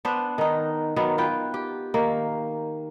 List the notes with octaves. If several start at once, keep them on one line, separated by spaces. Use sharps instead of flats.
B3 D4 B4 C5
D#3 D#4
D#3 F#3 B3
F4 B4 G5
G4
D#3 A#3